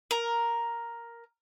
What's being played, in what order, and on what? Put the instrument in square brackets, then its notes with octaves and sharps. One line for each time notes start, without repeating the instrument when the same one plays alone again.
[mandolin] A#4